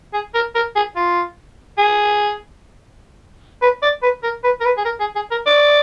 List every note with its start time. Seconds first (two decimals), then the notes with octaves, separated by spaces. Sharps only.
0.13 G#4
0.34 A#4
0.55 A#4
0.75 G#4
0.96 F4
1.78 G#4
3.62 B4
3.82 D5
4.02 B4
4.23 A#4
4.44 B4
4.60 A#4
4.65 B4
4.77 G#4
4.85 A#4
5.00 G#4
5.15 G#4
5.31 A#4
5.46 D5